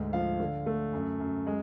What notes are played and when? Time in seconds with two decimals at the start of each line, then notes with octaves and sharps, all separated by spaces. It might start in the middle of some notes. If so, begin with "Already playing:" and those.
Already playing: D2 G#2
0.13 F3 F5
0.40 D3
0.66 A3
0.93 F#2
1.20 F#2
1.47 G#3